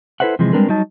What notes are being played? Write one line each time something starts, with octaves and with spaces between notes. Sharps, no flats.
E4 A4 B4 C5 E5 F#5
C3 E3 F3 G#3
G3 G#3 C4 D4 A#4 B4
F#3 G3 D#4 A5